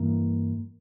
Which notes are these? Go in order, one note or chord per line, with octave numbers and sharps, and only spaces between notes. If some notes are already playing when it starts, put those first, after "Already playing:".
Already playing: G2 E3 A#3